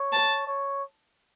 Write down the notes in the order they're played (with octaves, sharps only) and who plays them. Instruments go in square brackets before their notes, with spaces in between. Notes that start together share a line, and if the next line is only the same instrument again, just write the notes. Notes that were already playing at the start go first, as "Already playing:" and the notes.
Already playing: [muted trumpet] C#5
[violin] A5
[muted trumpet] C#5